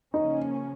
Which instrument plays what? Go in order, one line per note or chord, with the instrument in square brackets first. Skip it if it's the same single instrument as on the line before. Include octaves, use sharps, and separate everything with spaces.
[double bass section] C#3 F3 A#3 C#4 [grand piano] D#4